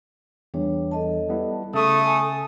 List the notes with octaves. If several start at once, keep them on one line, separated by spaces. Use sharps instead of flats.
E2 G3 D4 C#5
A4 D#5 A5
G3 B3 E4
C#3 A3 A4 C#6 D#6
G#5 A5